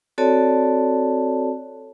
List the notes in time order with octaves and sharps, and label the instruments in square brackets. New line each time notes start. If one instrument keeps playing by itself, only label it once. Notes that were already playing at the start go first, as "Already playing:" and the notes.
[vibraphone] C4 F#4 A4 C#5 D5 A5